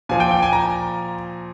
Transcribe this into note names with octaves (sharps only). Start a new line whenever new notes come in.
A#2 F3 G#5
G5
G5
G#5
A#5